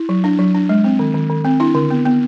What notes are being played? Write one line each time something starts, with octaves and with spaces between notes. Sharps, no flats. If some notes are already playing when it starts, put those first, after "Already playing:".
Already playing: E4
F#3
D4
F#3
D4
G#3
C4
D#3
D#3
D#3
C4
D4 E4
D3
B3
B3